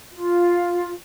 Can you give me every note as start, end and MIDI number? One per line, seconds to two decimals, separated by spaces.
0.11 0.90 65